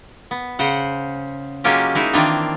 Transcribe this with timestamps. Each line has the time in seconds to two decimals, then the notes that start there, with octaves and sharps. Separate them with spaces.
0.31 B3
0.59 C#3 C5 F#5
1.64 F#3 G#3 A#3 C#4 F4 G4
1.95 G#3 D#4 E4
2.13 D#3 E3 A#3 C4 D4 F4